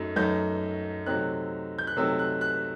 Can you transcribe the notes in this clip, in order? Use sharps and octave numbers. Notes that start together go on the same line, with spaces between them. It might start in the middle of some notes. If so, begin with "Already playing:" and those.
Already playing: F#2 A3 D#4
F#2 F#3 A3 D#4 G6
C3 F#3 A3 C4 D#4 F#6
G6
F#6
C3 F#3 A3 C4 D#4 E6
F#6
F#6